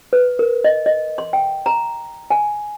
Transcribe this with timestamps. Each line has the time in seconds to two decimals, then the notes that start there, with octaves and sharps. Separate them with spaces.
0.13 B4
0.39 A#4
0.64 D#5
0.86 D#5
1.18 C6
1.33 G5
1.66 A#5
2.31 G#5